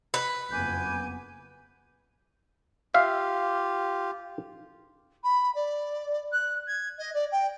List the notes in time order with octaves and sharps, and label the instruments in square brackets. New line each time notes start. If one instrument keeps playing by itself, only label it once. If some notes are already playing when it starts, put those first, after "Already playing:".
[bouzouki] B4
[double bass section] F#1 F2 B3 [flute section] G#5 D6 G6
[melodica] F4 G4 [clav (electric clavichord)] E5 F5
[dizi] B5
D5
F#6
G#6
D#5
D5
G5